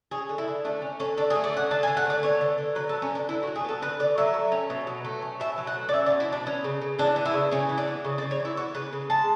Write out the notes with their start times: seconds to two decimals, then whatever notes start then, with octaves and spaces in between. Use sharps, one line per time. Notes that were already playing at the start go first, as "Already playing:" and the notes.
0.11 C#4 G#4
0.29 D3
0.38 E4
0.48 D3
0.64 A3 D4
0.82 C#4
1.00 D3 C#4
1.17 D3 D4
1.30 G#4
1.35 A3
1.44 D5
1.53 C#4 F#5
1.71 D3 A5
1.83 G#5
1.87 D3
1.97 F#5
2.05 A3 D5
2.23 B3 C#5
2.41 D3
2.58 D3
2.75 F#3 B4
2.89 A4
2.93 B3
3.02 C#4
3.11 D3 D4
3.29 D3 E4
3.43 F#4
3.47 F#3
3.56 G#4
3.64 B3 A4
3.82 D3 B4
3.99 D3 D5
4.17 F#3 E5
4.34 A3
4.52 C#4
4.70 B2
4.87 F#3
5.05 A3
5.22 C#4
5.40 B2 E5
5.58 F#3
5.67 F#5
5.76 A3
5.89 D5
5.93 C#4 E5
6.06 D5
6.10 B2
6.20 E4
6.28 F#3 D4
6.46 B3 C#4
6.64 C#3
6.82 C#3
6.99 E3 D4
7.16 B3
7.26 E4
7.34 C#3
7.51 C#3 C#4
7.69 E3
7.78 D4
7.88 B3
8.05 C#3
8.18 D5
8.22 C#3
8.31 C#5
8.40 E3
8.45 E4
8.57 B3 F#4
8.75 C#3 B4
8.93 C#3
9.10 G#3 A5